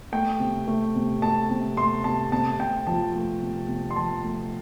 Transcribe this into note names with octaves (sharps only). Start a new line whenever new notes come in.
A3 G5
C3
A3
C3
A3 A5
C3
A3 C6
C3 A5
C3 A5
C3 G5
F3 A5
A3
C3
C3
C6
F3 A5
A3